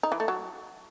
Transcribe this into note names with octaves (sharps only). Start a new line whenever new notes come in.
D#4
E3
A3
F#3